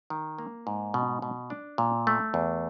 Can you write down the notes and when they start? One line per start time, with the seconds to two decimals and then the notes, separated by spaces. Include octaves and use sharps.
0.10 D#3
0.38 A#3
0.67 G#2
0.94 B2
1.22 B2
1.50 D4
1.78 A#2
2.07 A3
2.34 E2